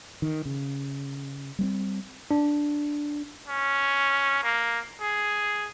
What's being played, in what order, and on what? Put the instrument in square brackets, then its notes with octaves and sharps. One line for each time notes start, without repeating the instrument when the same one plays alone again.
[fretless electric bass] D#3
C#3
G3 B3 C4
[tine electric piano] D4
[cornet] C#4
A#3
G#4